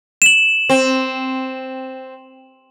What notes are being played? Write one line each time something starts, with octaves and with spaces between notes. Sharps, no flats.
E7 F#7
C4